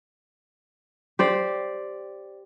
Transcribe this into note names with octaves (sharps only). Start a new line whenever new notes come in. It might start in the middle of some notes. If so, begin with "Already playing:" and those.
G4 C5 D5